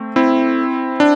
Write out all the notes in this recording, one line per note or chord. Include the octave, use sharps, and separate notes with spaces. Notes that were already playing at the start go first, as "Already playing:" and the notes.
Already playing: A3 C4
C4 E4
D4